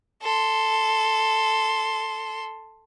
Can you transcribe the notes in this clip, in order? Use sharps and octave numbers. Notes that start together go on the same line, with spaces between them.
A4 C6